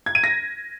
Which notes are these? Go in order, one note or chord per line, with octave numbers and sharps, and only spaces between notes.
G#6
D#7
A#6